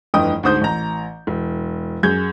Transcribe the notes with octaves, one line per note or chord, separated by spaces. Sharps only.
F1 G2 E3 D#5 G5 D#6
D2 G#2 C5 D#6 G6
A1 A#5
E1
F#2 G#4 G6 G#6